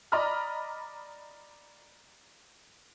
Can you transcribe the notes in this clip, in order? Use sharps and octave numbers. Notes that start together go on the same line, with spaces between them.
D5 D#5 A#5 B5 F6